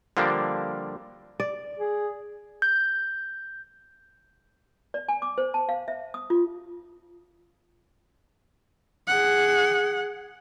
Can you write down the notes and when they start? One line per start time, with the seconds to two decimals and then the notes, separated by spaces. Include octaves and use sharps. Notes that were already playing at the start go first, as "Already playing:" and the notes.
0.17 D3 F3 G3 A#3 D4
1.40 D5
1.78 G#4
2.62 G6
4.94 D5
5.09 G#5
5.22 D6
5.38 C5
5.54 A5
5.69 F5
5.88 E5
6.14 D#6
6.30 F4
9.08 G#4 F#5